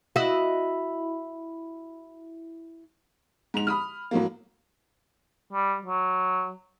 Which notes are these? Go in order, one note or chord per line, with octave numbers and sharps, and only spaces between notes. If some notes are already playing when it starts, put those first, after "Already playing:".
E4 F#4 D#5
G#2 F7
B5 D#6 F6
A2 F#3 A#3
G3
F#3